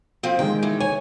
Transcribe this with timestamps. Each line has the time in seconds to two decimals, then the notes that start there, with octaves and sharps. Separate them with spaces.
0.23 F3 C4
0.39 D#3 G#3 G5
0.63 E3
0.80 C#5 G#5